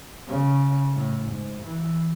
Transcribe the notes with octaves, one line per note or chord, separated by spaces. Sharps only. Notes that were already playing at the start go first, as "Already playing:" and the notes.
C#3
A2
G#2
E3